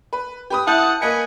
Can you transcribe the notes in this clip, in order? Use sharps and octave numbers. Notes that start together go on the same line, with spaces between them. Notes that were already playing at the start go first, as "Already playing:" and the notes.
B4
G4 B4 D#6
E4 F#5 A5 D#6 G6
A#3 B4 D#5 G#5 C#7